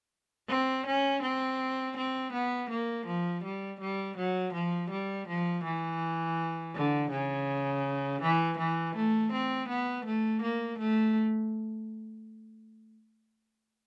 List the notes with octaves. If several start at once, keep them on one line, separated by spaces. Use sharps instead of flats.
C4
C#4
C4
C4
B3
A#3
F3
G3
G3
F#3
F3
G3
F3
E3
D3
C#3
E3
E3
A3
C4
B3
A3
A#3
A3